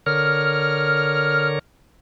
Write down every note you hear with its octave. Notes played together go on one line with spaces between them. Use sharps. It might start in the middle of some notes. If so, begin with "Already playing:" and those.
D3 A#4 C#5 F6